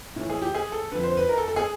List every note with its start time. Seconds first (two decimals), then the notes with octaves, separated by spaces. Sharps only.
0.16 A2 E3
0.30 G#4
0.42 G4
0.54 G#4
0.72 A4
0.92 F2 D3 B4
1.03 C5
1.17 B4
1.29 A#4
1.38 A4
1.48 A4
1.56 G#4